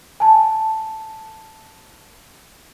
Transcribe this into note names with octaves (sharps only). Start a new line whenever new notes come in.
G#5 A5